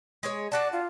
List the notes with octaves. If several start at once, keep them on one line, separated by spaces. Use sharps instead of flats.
G#3 G#4 C#5
D4 F#4 D5 A5
F4